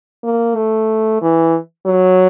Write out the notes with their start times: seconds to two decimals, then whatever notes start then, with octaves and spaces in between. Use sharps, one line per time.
0.24 A#3
0.56 A3
1.22 E3
1.86 F#3